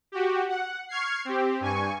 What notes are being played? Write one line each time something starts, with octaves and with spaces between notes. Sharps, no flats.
F#4 G4
F#5
C#6 F6 G#6 C7
C4 G4
G2 G#5 C#6